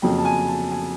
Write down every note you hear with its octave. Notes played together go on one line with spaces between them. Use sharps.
F2 C#3 F#3 A#3 G5
A5
G#5
A5
G#5